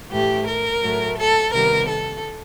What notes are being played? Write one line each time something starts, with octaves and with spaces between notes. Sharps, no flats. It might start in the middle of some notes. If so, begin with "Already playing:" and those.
A2 E3 A3 G4
A#4
A2 F#3 A3
A4
C3 D#3 G3 B3 A#4
A4